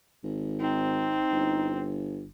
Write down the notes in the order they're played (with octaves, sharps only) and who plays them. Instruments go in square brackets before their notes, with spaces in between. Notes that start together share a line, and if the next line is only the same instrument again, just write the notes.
[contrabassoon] G#1
[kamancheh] C4 [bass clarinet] D#4
[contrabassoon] G1